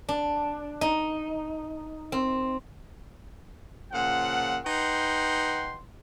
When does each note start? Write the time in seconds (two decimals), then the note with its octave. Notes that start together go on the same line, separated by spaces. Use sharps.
0.09 D4
0.81 D#4
2.12 C4
3.92 A#2 C#3 F3 F#5
4.65 D#4 B4 F#5 G5 C6